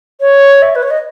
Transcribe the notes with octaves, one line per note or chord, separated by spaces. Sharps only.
C#5
E5
B4
C#5
D#5